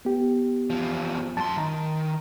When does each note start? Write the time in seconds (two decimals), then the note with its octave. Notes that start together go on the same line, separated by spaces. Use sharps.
0.05 B3 G4
0.70 E2 F3
1.37 F#2 A5 C6
1.58 D#3 A#5